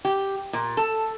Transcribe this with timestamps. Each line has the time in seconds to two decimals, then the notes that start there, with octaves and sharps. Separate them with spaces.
0.05 G4
0.53 A#2
0.77 A4